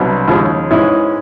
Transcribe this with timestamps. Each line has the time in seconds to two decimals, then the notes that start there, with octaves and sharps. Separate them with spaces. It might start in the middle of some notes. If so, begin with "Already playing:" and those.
Already playing: C2 B2 F#3 B3 D4
0.28 D#2 C#3 F3 G#3
0.71 G#2 E3 G#3 C#4 E4